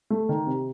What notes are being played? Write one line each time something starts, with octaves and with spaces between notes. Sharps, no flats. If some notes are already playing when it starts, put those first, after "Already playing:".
A3
D#3
C3